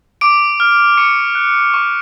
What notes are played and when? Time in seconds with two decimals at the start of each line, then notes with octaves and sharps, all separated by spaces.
0.21 D6 D7
0.60 F6
0.98 C#6 C#7
1.35 F#6
1.74 C#6